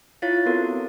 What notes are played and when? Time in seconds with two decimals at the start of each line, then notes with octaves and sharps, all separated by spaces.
0.22 E4 F4 C#5 F5 A6
0.46 B3 C4 F#4 A4 A#4